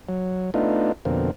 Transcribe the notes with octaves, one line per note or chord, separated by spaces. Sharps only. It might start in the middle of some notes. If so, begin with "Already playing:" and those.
F#3
A3 B3 D4 D#4 F4
F2 B2 D3 A#3 C4